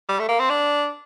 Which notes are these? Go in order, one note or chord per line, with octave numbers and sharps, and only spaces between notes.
G3
A3
A#3
C4
D4